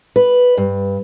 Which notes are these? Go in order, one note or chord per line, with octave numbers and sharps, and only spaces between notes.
B4
G2